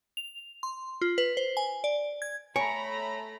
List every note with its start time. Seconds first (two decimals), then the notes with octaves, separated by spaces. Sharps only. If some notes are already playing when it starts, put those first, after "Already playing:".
0.17 F7
0.63 C6
1.01 F4
1.18 B4
1.37 C5
1.57 G#5
1.84 D5
2.22 G#6
2.56 A3 C#5 G#5 A#5 B5